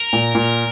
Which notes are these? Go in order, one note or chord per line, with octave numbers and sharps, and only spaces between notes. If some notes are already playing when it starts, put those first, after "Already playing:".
Already playing: A#4
A#2
A#2